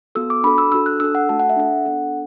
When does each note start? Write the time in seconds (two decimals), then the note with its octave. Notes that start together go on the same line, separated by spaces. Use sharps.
0.15 B3 F#4 A4 E6
0.30 D6
0.44 D4 F#4 A4 B5
0.58 E6
0.72 D4 F#4 A4 E6
0.86 F#6
1.00 D4 A4 E6
1.15 F#5
1.29 A3 F#4 A4 A5
1.40 F#5
1.49 E5
1.57 D4 A4 F#5
1.85 B3 D4 A4